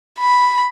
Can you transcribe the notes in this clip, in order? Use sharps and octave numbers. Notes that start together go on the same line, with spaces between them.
B5